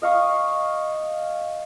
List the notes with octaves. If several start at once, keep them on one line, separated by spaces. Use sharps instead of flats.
D#5 F5 C#6 D#6